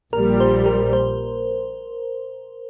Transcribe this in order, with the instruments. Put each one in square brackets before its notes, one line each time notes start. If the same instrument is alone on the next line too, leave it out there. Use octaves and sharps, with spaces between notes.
[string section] A#1 A#2 G3 [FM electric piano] A#4
[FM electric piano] C5
A#4
C5